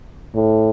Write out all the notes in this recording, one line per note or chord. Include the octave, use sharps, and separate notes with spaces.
A2